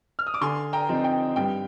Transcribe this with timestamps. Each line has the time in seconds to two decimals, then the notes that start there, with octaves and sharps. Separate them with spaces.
0.19 F6
0.27 D#6
0.34 D6
0.41 D3 G#5 C6
0.73 G5 A#5
0.89 F3 C4 D#4
1.04 G5
1.36 G2 G5